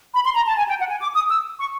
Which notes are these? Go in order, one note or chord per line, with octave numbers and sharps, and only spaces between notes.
B5
C6
A#5
A5
G#5
G5
F#5
G#5
D6
D#6
E6
C#6